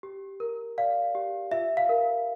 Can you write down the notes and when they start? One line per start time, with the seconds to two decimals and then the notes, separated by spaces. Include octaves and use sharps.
0.03 G4
0.40 A#4
0.78 D5 F5
1.15 G4
1.51 F4 E5
1.77 F5
1.89 A#4